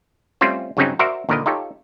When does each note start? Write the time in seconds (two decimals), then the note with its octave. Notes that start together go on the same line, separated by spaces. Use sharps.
0.41 G3 A3 C4 C#4 F4 C5
0.77 G2 C#3 F#3 C4 C#4 D#4
0.99 F#4 A#4 C5 D5 E5
1.29 D#2 A#2 D3 A#4 B4 D#5
1.46 D#4 F4 G4 A4 C#5